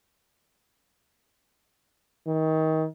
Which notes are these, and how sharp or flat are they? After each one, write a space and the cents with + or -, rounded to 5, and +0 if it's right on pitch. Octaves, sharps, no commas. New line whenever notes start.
D#3 +25